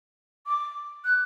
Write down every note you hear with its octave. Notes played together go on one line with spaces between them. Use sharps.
D6
F#6